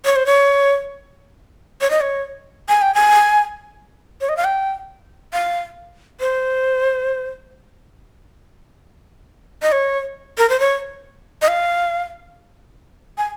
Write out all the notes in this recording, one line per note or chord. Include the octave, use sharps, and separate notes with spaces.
C#5
C5
C#5
C#5
D#5
C#5
G#5
G5
G#5
C#5
D#5
F5
G5
F5
C5
D#5
C#5
A#4
C5
C#5
D#5
F5
G#5